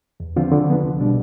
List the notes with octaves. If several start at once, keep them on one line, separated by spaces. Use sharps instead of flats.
E2
D3 F3 C4 F4
D3
F3 B3
C2
B2 G3 D4